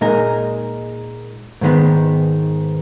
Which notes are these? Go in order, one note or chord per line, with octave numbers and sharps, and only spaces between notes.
A#2 G#3 D#4 A#4
G#2 D#3 G#3 B3